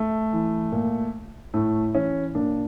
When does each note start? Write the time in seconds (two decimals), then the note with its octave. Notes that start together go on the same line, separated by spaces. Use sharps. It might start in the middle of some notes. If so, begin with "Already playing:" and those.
Already playing: A3
0.33 E3
0.72 A#2
1.54 A2 A3
1.95 E3 C#4
2.35 A#2 D4